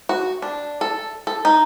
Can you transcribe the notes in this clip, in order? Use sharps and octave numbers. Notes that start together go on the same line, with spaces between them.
F#4
D4
A4
A4
D#4